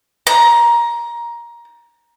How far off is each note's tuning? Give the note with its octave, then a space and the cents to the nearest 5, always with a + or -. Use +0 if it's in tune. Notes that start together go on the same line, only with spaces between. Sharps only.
A#5 +15